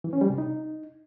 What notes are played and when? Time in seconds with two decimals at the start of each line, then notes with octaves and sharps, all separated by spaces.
0.04 E3
0.13 C#4
0.21 G3
0.30 C3
0.38 D#4